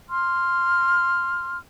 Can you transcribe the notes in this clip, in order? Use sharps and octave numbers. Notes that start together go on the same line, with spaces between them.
C6 F6